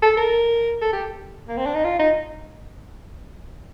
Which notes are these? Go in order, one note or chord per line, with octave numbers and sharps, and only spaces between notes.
A4
A#4
A4
G4
A#3
C4
D4
D#4
F4
D#4